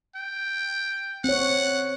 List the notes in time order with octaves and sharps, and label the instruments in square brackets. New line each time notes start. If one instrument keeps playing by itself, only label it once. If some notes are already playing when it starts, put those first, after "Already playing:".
[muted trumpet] G5
[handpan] C4 C#5 [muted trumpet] F#5